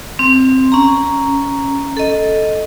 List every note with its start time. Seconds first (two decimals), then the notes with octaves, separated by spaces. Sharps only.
0.19 C4
0.72 C#4 A#5
1.97 A4 D#5